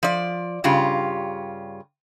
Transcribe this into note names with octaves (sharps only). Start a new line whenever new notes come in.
F3 D5
G2 C#3 F4 G4